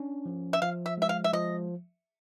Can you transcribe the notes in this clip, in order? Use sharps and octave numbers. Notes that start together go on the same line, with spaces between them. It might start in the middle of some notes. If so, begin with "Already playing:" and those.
Already playing: C#4 D4
F3
E5
F3 F5
E5
G#3 E5
F5
E5
F3 D#5